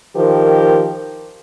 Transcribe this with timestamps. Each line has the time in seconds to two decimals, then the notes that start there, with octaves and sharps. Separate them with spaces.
0.16 D#3 F3 G4 A#4 C5